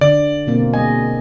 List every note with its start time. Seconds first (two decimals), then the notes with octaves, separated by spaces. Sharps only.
0.01 D3 D5
0.47 B2 A#3 C4
0.74 G#3 D#5 G#5